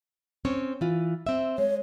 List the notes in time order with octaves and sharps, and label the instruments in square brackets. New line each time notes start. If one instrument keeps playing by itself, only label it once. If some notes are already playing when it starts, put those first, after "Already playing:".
[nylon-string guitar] C4 C#4 C#5
E3 F4
C4 E5
[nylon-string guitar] G#3 [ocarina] C#5